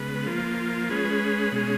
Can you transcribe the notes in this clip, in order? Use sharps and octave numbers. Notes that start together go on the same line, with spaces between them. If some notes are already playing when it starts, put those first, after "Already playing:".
Already playing: C#3 G#3 B3 B4
F3 A#3 F4
G#3 C#4 G#4 B4
B2 G#3 C#4 G#4